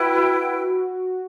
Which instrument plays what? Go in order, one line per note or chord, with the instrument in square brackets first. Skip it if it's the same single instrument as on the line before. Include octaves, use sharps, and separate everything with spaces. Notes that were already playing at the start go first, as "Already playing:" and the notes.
Already playing: [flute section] E4 B4 E5 G5 [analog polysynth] F#4